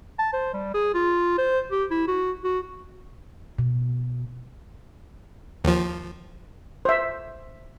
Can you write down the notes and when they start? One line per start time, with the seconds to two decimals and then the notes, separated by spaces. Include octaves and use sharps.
0.19 A5
0.33 C5
0.54 G3
0.74 G#4
0.94 F4
1.38 C5
1.72 G4
1.91 E4
2.08 F#4
2.44 F#4
3.59 B2
5.64 D#2 F3
6.85 C5 E5